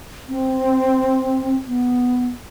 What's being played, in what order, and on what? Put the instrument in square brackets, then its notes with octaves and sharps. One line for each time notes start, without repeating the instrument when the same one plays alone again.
[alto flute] C4
B3